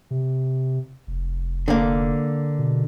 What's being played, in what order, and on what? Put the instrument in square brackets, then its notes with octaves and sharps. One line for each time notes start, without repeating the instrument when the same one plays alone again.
[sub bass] C3
F1
[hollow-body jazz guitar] D3 A#3
[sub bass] B2